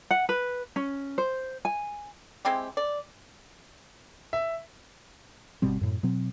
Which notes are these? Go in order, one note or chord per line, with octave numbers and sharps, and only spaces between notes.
F#5
B4
C#4
C5
G#5
G#3 C4 E4 G4
D5
E5
G1 B2 G3 C4
F#2 A2
B2 F#3 C4